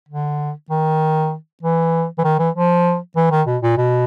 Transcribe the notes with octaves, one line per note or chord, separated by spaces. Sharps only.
D3
D#3
E3
E3
D#3
E3
F3
E3
D#3
B2
A#2
B2